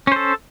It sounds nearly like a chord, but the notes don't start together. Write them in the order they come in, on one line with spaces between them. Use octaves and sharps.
C#4 C5 A4